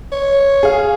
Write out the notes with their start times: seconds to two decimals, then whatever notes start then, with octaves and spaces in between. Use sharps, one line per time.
0.12 C#5
0.63 G#4 F5